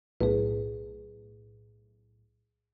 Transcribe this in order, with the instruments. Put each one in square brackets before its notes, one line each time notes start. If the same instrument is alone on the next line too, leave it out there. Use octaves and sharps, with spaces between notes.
[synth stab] B1 A2 [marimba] G#4 B4